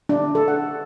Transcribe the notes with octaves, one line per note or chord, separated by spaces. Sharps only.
D4
A4
F#5